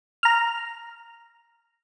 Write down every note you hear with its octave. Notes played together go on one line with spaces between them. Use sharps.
A#5 F6